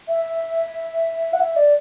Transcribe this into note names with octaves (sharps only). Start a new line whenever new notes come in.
E5
F#5
E5
D5